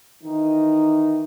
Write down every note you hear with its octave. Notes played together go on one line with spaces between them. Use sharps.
D#3 E3 D#4